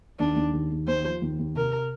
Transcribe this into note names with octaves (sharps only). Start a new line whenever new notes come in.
D#2 D4
D#2
D#2
D#2
D#2 C5
F3
D#2
D#2
C3 A#4